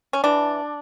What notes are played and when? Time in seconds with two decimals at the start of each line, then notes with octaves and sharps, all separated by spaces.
0.13 C#4
0.24 E3 D4